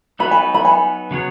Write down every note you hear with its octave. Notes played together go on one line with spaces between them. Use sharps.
F#3 B3 D#4 F#4 B4 B5
G#5
B5
G#5
C#3 F#3 B3 G#4 C#5